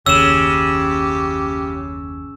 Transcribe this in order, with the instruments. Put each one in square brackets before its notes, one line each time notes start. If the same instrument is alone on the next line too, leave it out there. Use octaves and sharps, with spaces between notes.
[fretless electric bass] F#1 D#2 [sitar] C#3 [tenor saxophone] G4 [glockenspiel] E6 E7